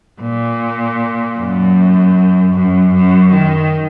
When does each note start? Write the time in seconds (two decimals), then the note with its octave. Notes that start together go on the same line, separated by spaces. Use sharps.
0.22 A#2
1.38 F#2
2.55 F#2
2.94 F#2
3.33 D#3